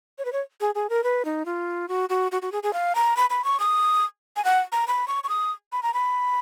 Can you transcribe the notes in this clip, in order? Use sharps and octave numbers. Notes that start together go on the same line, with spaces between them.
C#5
B4
C#5
G#4
G#4
A#4
B4
D#4
F4
F#4
F#4
F#4
F#4
G#4
G#4
F5
A#5
B5
B5
C#6
D#6
G#5
F#5
A#5
B5
C#6
C#6
D#6
B5
A#5
B5